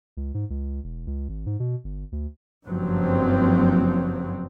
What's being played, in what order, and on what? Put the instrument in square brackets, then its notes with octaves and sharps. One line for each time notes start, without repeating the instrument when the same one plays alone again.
[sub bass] C#2
G#2
C#2
E1
C#2
G#1
G#2
B2
G1
D2
[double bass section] F#1 G2 F3 F#3 C4